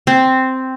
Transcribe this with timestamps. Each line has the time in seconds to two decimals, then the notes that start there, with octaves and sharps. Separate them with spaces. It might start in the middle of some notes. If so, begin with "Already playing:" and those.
0.07 C4